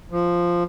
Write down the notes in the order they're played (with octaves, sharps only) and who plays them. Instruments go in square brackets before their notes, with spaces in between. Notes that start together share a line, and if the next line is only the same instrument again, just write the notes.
[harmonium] F3